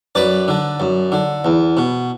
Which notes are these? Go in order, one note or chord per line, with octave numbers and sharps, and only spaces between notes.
F#2 B4 D5
D3
F#2
D3
E2
B2